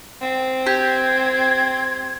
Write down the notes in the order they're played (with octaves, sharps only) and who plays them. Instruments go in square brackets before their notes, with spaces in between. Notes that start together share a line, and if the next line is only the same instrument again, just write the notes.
[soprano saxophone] C4
[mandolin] G4 [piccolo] G#6